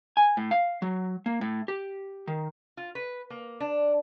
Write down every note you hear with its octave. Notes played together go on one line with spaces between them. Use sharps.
G#5
A2
F5
F#3
A#3
A2
G4
D#3
F4
B4
A#3
D4